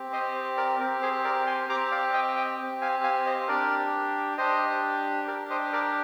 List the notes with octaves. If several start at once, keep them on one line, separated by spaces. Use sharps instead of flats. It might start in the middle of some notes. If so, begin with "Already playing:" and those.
Already playing: C4 G4
C5 D#5
A#4 D5
C4 G4 A#4
G#4 C5
A#4 D5
G#5 C6
C4 G4 A#5 D6
D5 F5
D#5 G5
D#5 G5
C4 G4
F5 G#5
F5 G#5
C5 D#5
D4 G4 A#4 D5
D4 G4 C5 D#5
D4 G4 A#4 D5
C5 D#5
A#4 D5